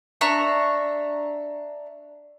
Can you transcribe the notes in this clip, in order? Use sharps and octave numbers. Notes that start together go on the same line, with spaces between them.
D4 E5 A#5 C#6